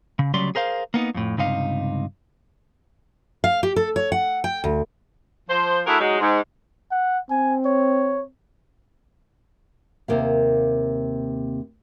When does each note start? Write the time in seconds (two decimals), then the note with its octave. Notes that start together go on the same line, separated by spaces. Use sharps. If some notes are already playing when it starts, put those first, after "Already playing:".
0.19 C#3
0.34 D2 C#3 F#3 G3 D5 C6
0.55 G#4 A#4 C5 F5
0.94 A#3 B3 D#4
1.14 F2 A2
1.37 C#2 G2 C3 D#4 F5
3.44 F5
3.63 G4
3.76 A4
3.96 C#5
4.12 F#5
4.44 G5
4.64 D2
5.49 F3 C5
5.86 A3 D4 E4 F#4 G#4 A#4
6.00 F#3 G#3 D#4
6.20 G#2
6.91 F#5
7.31 C4 G#5
7.66 C#5
10.08 D#2 C3 A#3 F5